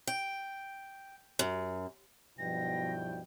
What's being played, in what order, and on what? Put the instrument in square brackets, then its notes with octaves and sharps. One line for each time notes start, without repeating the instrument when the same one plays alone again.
[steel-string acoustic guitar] G5
F#2
[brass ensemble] B1 E4 G5 [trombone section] G2 B2 [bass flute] F3 [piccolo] A#6